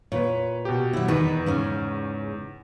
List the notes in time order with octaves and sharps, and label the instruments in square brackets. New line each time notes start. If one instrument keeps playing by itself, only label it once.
[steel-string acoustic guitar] A#2 [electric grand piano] B4 C#5
[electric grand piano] B2 G4
[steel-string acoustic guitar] F#3 E4
[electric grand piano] E2 [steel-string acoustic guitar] D#3 D#4 B4
[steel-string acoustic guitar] G#2 C#3 C#4